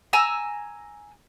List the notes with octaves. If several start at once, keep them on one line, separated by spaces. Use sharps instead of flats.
G#5 A#5 E6